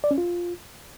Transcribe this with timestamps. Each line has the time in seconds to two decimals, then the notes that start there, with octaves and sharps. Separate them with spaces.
0.04 D5
0.11 C#4
0.18 F4